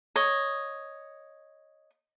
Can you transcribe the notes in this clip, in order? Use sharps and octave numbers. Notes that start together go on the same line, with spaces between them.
C#5 D#5